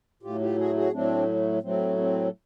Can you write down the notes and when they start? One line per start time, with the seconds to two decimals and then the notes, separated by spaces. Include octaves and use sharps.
0.23 A2 F#3 A3 F4 G4
0.41 F4 G4
0.58 F#4 G#4
0.75 F#4 G#4
0.92 A2 F#3 A3 C4 D4
1.62 A2 F#3 A3 C4
1.97 C4